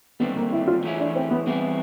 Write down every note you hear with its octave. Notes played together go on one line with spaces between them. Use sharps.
D#2 D3 G3 B3 C4
A#3
E4
F4
E3 A3 C#4 E4 G#4
D4
C4
B3
E3 G3 B3 C4 E4 G#4